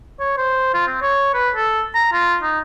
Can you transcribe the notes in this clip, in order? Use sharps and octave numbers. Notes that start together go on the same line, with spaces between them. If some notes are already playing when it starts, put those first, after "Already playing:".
C#5
C5
F4
C4
C#5
B4
A4
A#5
F4
D#4